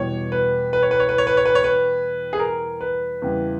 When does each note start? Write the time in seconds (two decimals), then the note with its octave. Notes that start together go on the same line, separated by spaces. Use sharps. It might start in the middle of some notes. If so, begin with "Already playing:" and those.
Already playing: E2 B2 G3 C#5
0.32 B4
0.73 B4
0.83 C#5
0.91 B4
1.00 C#5
1.09 B4
1.18 C#5
1.27 B4
1.37 C#5
1.45 B4
1.55 C#5
1.64 B4
2.33 G#4
2.39 A#4
2.81 B4
3.22 E2 C#3 E3 G3